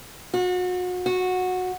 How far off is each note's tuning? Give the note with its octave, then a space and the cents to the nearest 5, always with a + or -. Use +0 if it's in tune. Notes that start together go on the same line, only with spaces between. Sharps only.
F#4 -35
F#4 -15